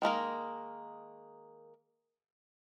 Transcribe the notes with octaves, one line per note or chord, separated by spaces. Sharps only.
D#3 G#3 A#3 A#4